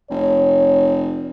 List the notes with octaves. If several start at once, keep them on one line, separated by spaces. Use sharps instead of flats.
F1 C#5